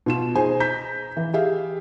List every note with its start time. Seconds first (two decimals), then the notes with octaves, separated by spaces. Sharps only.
0.06 B2 F4 E7
0.35 D#4 G#4 C5 G#5
0.60 A#5 G6 B6
1.17 E3
1.34 G4 G#4 E5 F5